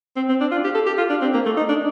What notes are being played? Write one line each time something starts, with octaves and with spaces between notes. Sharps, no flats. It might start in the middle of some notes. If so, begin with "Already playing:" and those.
C4
C4
D4
F4
G4
A4
G4
F4
D4
C4
A#3
A3
D#4
D4